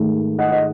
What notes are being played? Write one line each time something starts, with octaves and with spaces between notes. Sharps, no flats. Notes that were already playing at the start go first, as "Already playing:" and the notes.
Already playing: G#2 D#3 A3
D#5 F#5
D#5